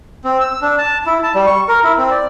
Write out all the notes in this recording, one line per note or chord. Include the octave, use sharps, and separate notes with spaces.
C4
E6
D4
A5
E4
A5
G3
C#6
A#4
E4
C4
D5